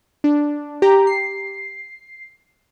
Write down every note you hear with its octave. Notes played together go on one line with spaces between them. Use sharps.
D4
G4 A#5
C7